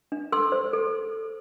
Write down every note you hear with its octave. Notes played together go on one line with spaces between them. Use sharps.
D4
A4 C6 E6
C5
A4